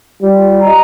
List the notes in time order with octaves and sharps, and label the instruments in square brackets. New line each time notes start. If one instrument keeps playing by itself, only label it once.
[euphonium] G3 [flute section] F4
[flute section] D#5 A#5